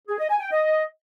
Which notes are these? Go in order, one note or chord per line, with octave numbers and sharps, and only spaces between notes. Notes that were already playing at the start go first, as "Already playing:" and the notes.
G#4
D#5
G#5
G5
D#5